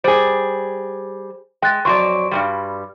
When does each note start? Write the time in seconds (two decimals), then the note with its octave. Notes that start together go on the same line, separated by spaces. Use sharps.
0.04 G3 G#4 C5
1.62 G#3 G5 F#6 A6
1.85 F2 F#3 D5 C6 C#6
2.31 G2 C3 G3